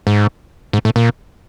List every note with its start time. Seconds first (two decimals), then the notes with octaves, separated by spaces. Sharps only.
0.07 G#2
0.73 G#2
0.85 A2
0.96 A#2